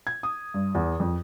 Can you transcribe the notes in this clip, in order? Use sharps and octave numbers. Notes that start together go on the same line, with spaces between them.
G#6
D#6
G2
E2
F2